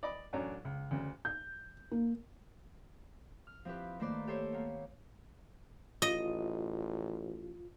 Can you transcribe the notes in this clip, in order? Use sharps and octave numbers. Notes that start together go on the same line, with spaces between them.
D5 D#5 B5 D6
A1 F#2 C#4 D4 C#5 A#5
C#2
D2 C#3
G6
A#3
F6
F3 C4 E4 G4 B4
D#3 A3 A#3 B4 C5 D5
G4 A4 C5 C#5
A#3 B3
A1 F4 D#5